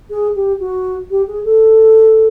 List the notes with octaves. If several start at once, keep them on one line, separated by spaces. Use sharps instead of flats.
G#4
G4
F#4
G4
G#4
A4